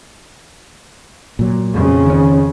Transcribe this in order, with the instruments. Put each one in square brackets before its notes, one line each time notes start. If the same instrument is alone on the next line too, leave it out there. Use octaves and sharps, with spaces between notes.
[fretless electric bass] A#2 F#3
[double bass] F2 C#3
[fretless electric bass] D#3 C#4